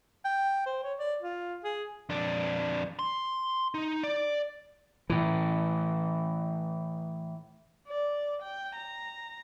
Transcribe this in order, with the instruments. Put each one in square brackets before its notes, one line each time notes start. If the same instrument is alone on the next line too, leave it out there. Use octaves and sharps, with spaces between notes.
[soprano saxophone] G5
C5
C#5
D5
F4
G#4
[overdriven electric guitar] F2 D4
C6
D#4
D5
[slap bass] A2 E3
[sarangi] D5
G5
A#5